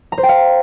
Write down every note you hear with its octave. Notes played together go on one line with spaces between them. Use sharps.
A#5
C5
G5
F5